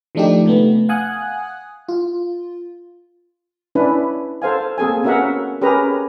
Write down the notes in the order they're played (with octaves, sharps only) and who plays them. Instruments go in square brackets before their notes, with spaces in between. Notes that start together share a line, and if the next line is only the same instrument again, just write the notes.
[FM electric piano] D#3 F3 A3 D4 D#4 G4
C3 A3 B3
F5 F#5 G#5 D#6 F#6
F4
[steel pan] C#4 D4 E4 B4
A4 C5 F5 G#5
A#3 C4 G#4 A4 G#5
B3 C#4 F#4 A#4 E5 F#5
C#4 G4 G#4 A#4 B4 A#5